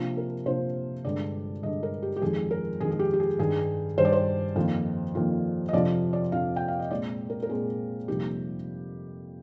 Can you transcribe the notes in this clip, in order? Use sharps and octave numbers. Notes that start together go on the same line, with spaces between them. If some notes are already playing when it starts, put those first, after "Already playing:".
Already playing: C3 F3 A#3 D4 F4
A#4
C3 F3 A#3 D4 F4 C5
G2 D3 G#3 D4 D5
G2 D3 G#3 D4 D#5
A#4
G4
G4
F2 D#3 G#3 D#4 G#4
A#4
F2 D#3 G#3 D#4 G#4
G#4
G4
G4
G#4
G2 D#3 G3 G#4
G2 D#3 G3 C5
D5
C5
F2 D#3 A#3 F4
F2 D#3 A#3 F4
D#5
F2 C3 F3 C4 F4 D5
D5
F2 C3 F3 C4 F4 F5
G5
F5
D#5
A#2 G#3 C4 D5
A#4
A#4
A#2 G#3 C4 G#4
F2 C3 G3 A#3 D#4 G4